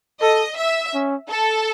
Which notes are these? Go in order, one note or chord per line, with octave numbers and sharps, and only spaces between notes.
A4 D#5
E5
C#4
A4